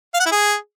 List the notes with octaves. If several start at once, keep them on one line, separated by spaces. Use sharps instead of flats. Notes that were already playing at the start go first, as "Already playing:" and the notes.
F5
F#5
E4
G#4